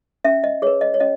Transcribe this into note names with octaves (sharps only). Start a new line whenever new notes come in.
C#4 E5
D#5
G#4 B4 C#5
D#5
C#5
C#4 D#5